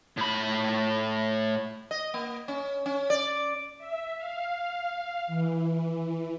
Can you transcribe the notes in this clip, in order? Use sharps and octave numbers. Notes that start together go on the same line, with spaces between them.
A2 B5
D#5
A#3
C#4
C#4
D5
E5
F5
E3